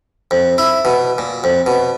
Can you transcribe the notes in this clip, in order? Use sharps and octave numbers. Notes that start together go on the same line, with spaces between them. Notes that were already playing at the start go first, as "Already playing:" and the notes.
F2
E4
B2
A#2
F2
B2